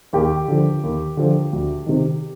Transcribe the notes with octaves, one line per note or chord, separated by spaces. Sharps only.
D#2 G4
D3 F3
D#2
D3 F3
D2
C3 D#3